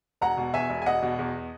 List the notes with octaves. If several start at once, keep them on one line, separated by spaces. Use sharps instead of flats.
E1 F#5 A#5
B2
E2 E5 G#5
E1
G#5
E1 D#5 F#5
B2
E2